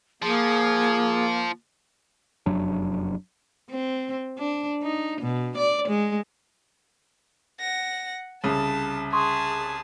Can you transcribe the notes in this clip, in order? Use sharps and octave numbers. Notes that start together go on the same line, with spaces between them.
F3 A#3 G#4
F1 F#2 F#3 D4
C4
D4
D#4
B2
D5
G#3
F#5 A#6
C2 C#3 A5
G#4 A5 C6 C#6 D#6